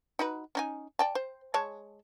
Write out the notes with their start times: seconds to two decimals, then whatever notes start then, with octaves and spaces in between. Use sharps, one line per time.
0.19 D#4 F#4 B4
0.55 C#4 D#4 G#5
0.99 D5 G5 A5
1.15 C5
1.54 G#3 C#5 A5